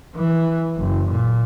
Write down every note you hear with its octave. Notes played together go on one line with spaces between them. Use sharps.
E3
F#1
A#2